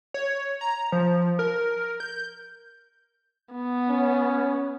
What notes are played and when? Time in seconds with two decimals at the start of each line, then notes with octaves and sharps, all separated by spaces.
0.14 C#5
0.61 A#5
0.92 F3
1.39 A#4
2.00 G6
3.53 B3
3.89 C#4